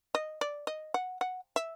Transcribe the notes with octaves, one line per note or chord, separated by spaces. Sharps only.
D#5
D5
D#5
F#5
F#5
E5